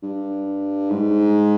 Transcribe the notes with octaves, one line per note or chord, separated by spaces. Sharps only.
G2
G#2